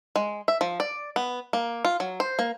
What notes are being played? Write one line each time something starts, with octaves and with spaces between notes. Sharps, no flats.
G#3
E5
F3
D5
B3
A#3
F4
F#3
C5
A#3